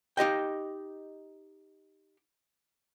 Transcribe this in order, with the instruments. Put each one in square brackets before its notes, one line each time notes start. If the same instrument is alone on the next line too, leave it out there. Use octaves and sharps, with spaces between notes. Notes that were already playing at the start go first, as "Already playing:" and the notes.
[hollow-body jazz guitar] D#4 G4 D#5 G5